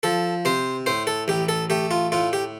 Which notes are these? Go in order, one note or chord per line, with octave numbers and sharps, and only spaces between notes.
F3 A4
C3 C5
A2 C5
A4
A1 G4
A4
A3 G4
F4
A2 F4
G4